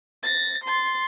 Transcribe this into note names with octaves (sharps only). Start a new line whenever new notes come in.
A6 A#6
C6 A6